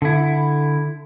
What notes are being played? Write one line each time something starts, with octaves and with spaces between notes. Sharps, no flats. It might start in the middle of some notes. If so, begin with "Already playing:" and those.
D3 E4